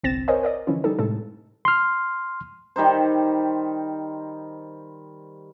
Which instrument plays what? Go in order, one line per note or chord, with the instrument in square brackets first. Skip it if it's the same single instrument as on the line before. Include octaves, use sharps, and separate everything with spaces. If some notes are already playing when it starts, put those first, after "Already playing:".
[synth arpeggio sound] G1 C2 C4 A6 A#6 E7
A#4 C5 C#5 D#5 G#5
A#4 D5 D#5
D3 E3 F3 C#4 E4
G3 D#4 A4
A2 C3 G#3 A4
[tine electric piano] C6 F6
[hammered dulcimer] D#3 G3 D#4 C5